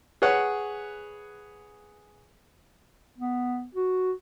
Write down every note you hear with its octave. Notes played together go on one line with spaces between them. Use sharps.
G#4 B4 C#5 F#5 C#6
B3
F#4